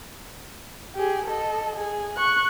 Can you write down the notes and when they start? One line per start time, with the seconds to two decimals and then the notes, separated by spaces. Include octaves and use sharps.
0.96 G4 G#4
1.26 A4 D#5
1.76 G#4
2.17 C#6 F#6